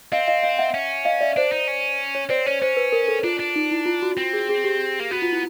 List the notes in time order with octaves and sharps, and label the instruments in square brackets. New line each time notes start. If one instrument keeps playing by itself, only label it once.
[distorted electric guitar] C4 [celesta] D#5 F5
[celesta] D#5 F5
D#5 F5
E5 F#5
[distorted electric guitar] C#4
[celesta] D#5 F5
D5 E5
[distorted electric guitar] D4 [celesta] C5 D5
[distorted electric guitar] D#4
C#4
[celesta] C#5
[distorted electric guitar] C4 [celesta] C5 D5
[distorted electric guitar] C#4 [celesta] C#5
[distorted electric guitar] C#4 [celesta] C5
[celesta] B4
A#4
A4
[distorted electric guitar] D4 [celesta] F4
[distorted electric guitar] D4
[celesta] D#4
E4
F4
F#4
[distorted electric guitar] C4
[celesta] G#4
G#4
G4
[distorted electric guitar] A#3
[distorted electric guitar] B3 [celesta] F#4
[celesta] F4
E4